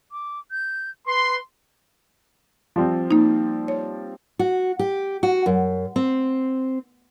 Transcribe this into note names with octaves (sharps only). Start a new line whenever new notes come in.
D6
G6
B4 C6
F3 G3 C4
A#3 D#4
C#5
F#4
G4
F#4
F#2
C4